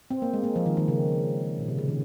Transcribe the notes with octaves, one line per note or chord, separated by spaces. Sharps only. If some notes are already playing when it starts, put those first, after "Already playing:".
C4
A#3
G#3
A#3
F3
D#3
D#3
C#3
A#2
C3
C#3
D#3